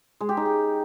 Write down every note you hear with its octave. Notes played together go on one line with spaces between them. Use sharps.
G#3
G4
D#4
G4